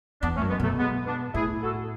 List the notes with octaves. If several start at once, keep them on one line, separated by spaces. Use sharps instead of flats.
E2 B3 D4
A3 C#4
F#2
G#3 B3
B2 F#3 A3
G#3 B3
B3 D4
A2 E4 G#4
F#4 A4